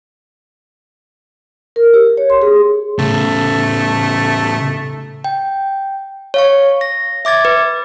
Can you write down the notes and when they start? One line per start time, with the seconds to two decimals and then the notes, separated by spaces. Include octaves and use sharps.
1.76 A#4
1.94 G4
2.17 C#5
2.30 C6
2.42 G#4
2.99 A2 C#3 A3
5.24 G5
6.34 C#5 F5 C#6
6.81 A#6
7.25 E5 D6 G#6 A6
7.45 B4